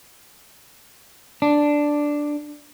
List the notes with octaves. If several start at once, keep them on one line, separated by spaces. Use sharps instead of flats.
D4